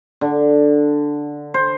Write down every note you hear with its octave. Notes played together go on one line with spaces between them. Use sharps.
D3
C5